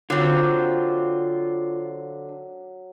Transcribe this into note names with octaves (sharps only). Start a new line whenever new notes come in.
D3 F#3 C4 F4